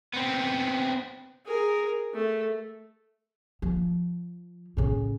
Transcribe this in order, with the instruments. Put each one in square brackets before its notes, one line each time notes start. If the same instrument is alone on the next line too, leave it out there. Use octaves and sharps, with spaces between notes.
[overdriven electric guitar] B3 C4
[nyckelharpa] G#4 A#4
A3
[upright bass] F3
A2 C#3